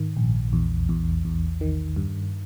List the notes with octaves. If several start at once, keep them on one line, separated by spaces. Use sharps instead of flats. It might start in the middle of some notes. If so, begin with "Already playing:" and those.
Already playing: G#2 D#3
A#1
E2
E2
E2
D#3
G2